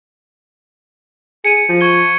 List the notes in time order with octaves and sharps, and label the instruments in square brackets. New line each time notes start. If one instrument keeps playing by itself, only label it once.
[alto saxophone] G#4 [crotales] C#7 D#7
[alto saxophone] F3
[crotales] C#6 G#6 G7